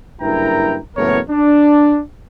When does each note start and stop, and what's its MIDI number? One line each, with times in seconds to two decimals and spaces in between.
0.21 0.78 30
0.21 0.78 43
0.21 0.78 64
0.21 0.78 70
0.21 0.78 79
0.21 0.78 82
0.97 1.20 30
0.97 1.20 40
0.97 1.20 45
0.97 1.20 59
0.97 1.20 70
0.97 1.20 73
1.31 2.00 62